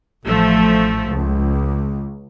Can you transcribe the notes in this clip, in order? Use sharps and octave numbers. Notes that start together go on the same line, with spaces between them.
A1 F3 A3
C#2